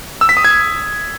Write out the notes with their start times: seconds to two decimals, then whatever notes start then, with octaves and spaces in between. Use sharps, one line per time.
0.21 E6
0.29 B6
0.37 D#6
0.45 G#6